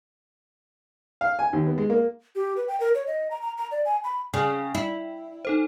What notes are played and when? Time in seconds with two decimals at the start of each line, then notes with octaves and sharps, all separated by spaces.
1.21 F5
1.39 G#5
1.53 D#2
1.66 B3
1.78 G#3
1.90 A#3
2.36 G4
2.57 B4
2.68 G5
2.80 A#4
2.95 C#5
3.07 D#5
3.31 A#5
3.42 A#5
3.58 A#5
3.71 D5
3.85 G#5
4.04 B5
4.34 C#3 D5 G5
4.75 E4
5.45 D#4 A4 C5